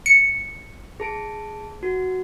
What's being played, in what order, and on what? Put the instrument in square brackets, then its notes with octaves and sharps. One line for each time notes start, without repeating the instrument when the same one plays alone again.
[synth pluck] C#7
[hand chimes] G#4 A5 D7
F#4